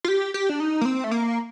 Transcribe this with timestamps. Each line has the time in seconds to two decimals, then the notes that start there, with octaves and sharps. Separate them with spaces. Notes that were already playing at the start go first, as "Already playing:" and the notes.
0.04 F4
0.08 G4
0.34 G4
0.49 D4
0.60 D#4
0.81 A#3
0.85 C4
1.04 A3
1.11 A#3